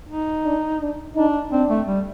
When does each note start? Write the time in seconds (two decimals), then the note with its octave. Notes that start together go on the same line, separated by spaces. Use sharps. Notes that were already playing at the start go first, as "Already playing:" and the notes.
0.09 D#4
0.45 D4
0.80 D4
1.15 D4 D#4
1.51 C4 D4
1.69 A3
1.87 G3